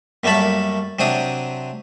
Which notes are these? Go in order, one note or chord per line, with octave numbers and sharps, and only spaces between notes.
F#2 G3 A3 A#3 A5 B5
C3 F#3 C4 D4 D#6